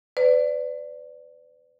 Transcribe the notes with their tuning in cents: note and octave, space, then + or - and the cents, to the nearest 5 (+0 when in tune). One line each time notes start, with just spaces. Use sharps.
B4 +35 D5 +0